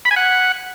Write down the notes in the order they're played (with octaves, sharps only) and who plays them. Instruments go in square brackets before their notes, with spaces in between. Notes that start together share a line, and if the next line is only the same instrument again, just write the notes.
[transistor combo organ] B5
G#5
F#5